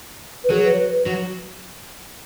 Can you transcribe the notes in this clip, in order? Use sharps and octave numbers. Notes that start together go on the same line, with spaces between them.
B4
F#3 G#4
B4
C#5
B4
B4
F#3